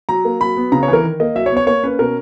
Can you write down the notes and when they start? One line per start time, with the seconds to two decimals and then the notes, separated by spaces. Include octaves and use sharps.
0.09 F#3 A#5
0.25 A#3
0.41 F#3 B5
0.57 B3
0.72 C#3 A#5
0.83 C#5
0.88 E3 A#4
1.04 D#3
1.20 A#3 D#5
1.35 F#3 E5
1.46 C#5
1.51 B3
1.57 C#5
1.67 A#3 C#5
1.83 C#4 B4
1.99 B2 A#4